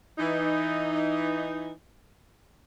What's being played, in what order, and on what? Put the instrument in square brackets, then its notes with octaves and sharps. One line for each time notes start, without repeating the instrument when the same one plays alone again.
[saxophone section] E3 D#4